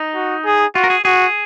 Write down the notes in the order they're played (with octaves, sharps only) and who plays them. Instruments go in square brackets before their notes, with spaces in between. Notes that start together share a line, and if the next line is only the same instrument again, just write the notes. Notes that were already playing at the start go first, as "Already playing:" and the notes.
Already playing: [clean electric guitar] D#4
[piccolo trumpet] F#4
G#4
[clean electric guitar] F4 [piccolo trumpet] F#4
[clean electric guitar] A#4
G#4
[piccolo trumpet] F#4 [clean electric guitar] G#4